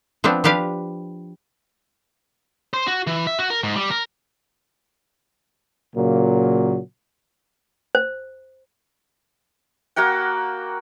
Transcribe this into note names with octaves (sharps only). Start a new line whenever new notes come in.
F3 B3 C4 D4
F3 D4 G4 B4 F5
C5
F#4
E3
E5
F#4
A#4
G#2
G3
A#4
A#2 C#3 F#3 A#3
C5
A#3 F#4 F#5 G5